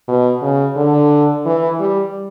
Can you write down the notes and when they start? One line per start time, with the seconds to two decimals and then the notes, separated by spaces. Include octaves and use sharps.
0.08 B2
0.42 C#3
0.76 D3
1.46 E3
1.79 G3